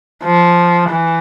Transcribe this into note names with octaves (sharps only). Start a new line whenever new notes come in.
F3
E3